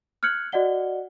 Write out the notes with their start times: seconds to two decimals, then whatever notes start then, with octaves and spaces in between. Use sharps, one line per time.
0.23 F6 F#6 G#6 C#7 F#7
0.52 F#4 D5 D#5 F#5 G7